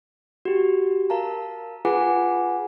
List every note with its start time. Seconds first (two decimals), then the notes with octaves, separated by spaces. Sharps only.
0.45 F#4 G4
1.10 A#4 F5 A5 A#5
1.85 F4 G#4 B4 F#5 G#5 D6